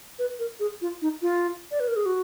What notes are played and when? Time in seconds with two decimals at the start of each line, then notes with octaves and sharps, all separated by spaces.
0.19 B4
0.39 A#4
0.60 G#4
0.81 F4
1.02 D#4
1.22 F4
1.71 D5
1.80 B4
1.88 A#4
1.96 G#4
2.06 F#4